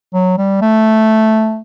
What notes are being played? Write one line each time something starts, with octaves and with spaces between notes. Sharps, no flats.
F#3
G3
A3